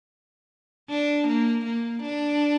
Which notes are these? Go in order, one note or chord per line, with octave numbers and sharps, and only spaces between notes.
D4
A#3
A#3
D4